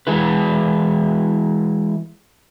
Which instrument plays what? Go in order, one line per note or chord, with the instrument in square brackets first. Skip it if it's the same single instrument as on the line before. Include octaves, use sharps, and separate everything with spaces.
[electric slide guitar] E3 G#3 E4 B4